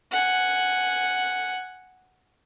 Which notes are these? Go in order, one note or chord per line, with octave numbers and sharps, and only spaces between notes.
F#5 G#5